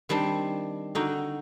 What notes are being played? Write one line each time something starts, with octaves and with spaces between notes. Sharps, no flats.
D#3 G3 C4 D4
D3 D#4 F#4